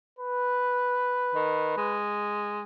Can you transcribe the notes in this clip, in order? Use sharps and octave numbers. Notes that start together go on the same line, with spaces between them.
B4
D#3
G#3